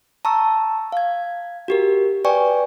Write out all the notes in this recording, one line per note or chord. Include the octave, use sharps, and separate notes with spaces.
A5 A#5 C#6 E6
F5 G#6
F#4 G4 A#4
B4 D5 G5 G#5 C#6